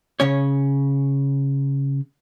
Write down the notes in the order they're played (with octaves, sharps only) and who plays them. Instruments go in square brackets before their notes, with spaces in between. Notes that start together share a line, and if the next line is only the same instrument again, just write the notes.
[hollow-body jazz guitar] C#3 C#4 C#5